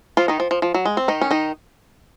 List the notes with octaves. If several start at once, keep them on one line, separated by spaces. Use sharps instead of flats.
F3 F4
D#3 D#4
F3
F3
F3
F#3
G#3
C4
D#3 D#4
C#4
D#3 D#4